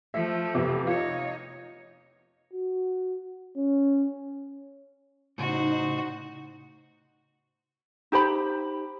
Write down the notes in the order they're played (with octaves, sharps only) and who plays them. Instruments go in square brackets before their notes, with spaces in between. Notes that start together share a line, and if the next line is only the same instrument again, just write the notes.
[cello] F3 A3 [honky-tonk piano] E5
[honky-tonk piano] F2 C3 B3
[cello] D#4 C#5 [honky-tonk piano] F4
[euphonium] F#4
C#4
[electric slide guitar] A2 C#3 [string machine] D#4 [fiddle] F#4 C5
[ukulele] D#4 G4 C5 B5